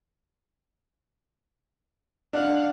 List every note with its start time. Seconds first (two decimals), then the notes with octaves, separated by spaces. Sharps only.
2.33 D4 F5 F#5